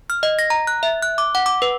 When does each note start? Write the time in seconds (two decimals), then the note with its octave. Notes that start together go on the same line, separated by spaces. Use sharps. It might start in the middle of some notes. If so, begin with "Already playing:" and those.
0.10 F6
0.23 D#5
0.39 A#6
0.50 A#5
0.67 F#6
0.83 E5
1.02 F#6
1.18 D6
1.35 F#5
1.46 D6
1.62 B4